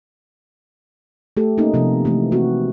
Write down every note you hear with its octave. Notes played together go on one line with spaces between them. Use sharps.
A3 G4 A4
A#3 C#4 D#4
C3 F3 B3
E3 A3
A#3 C4 F#4